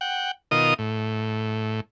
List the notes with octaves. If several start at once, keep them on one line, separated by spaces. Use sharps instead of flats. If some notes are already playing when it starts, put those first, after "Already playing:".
F#5 G5
B2 D#3 F4 A#4 D#5 D#6
A2